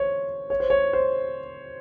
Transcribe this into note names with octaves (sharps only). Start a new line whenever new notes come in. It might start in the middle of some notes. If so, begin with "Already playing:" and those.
Already playing: C5 C#5
C#5
C5
C#5
C5